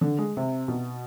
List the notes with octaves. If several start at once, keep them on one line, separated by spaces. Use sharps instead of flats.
D3
G#3
C3
B2